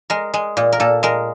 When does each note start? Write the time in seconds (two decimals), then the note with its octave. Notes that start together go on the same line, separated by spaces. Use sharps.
0.10 G#3 A#4
0.34 G#3
0.57 A#2
0.72 A#4
0.80 A#2 A4
1.03 G#3 A#4